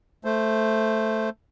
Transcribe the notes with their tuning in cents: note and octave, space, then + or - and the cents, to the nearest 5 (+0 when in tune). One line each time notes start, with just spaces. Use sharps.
A3 +0 C5 +0